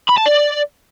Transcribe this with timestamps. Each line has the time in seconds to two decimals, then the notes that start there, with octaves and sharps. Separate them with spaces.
0.09 B5
0.17 A5
0.26 D5